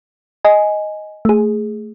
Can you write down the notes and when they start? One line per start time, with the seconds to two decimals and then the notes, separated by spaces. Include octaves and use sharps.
0.45 D#5 G#5
1.25 A3 G#4